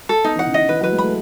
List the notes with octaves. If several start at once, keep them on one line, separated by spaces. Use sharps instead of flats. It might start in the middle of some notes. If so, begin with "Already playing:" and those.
A4
B3 D#4
E3 F#5
C#3
D#3 D#5
E3 B4
F#3 B4
G#3
A3 B5